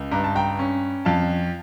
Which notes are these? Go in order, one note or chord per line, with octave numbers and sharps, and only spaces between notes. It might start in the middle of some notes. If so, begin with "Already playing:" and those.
Already playing: C#2
G2 A#5
A5
G5 A#5
C#4
F2 F5 A5